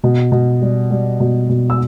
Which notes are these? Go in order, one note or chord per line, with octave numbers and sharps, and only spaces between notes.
B2
B2
G3
G3
B2
B2
E6